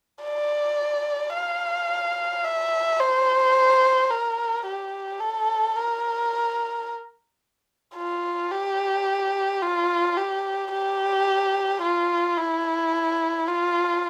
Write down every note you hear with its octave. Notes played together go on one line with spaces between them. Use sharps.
D5
F5
E5
C5
A#4
G4
A4
A#4
F4
G4
F4
G4
G4
F4
E4
F4